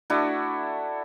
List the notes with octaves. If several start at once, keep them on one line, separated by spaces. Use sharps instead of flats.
A3 D4 E4 F#4